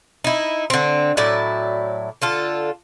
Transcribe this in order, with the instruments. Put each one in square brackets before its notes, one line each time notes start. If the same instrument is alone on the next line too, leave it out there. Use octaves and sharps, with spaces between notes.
[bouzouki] D#4 E4
D3 C4
A2 F#3 E4 D5
D3 F4 A4